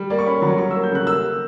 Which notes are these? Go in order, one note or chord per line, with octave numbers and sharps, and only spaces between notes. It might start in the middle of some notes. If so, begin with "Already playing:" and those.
Already playing: G3
A#3 D5
C#6
C#4 B5
F#3 C#6
G3 C#6
A#3 E6
G6
C#3 F#6
A#3 E6